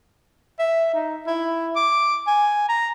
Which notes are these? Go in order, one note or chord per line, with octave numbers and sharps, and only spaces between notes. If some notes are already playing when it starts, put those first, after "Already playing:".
E5
D#4
E4
D6
G#5
A#5